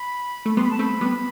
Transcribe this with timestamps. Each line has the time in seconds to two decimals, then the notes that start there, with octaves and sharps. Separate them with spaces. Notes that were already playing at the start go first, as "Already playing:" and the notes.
Already playing: B5
0.46 A3
0.57 G3 B3 C6
0.63 B5
0.71 A5
0.79 A3 C4 B5
1.01 G3 B3